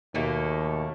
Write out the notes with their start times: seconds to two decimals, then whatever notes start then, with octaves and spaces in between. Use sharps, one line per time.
0.15 D#2 B2 A3 A#3